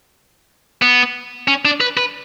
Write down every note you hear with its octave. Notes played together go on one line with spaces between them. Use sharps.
B3
C#4
D4
B4
B4